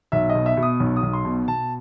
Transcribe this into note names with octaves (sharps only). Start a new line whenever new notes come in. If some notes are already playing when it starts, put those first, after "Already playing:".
B1 E5
D#5
B2
E5
B2
D#6
B1
D#6
B1
C6
B2
B2 A5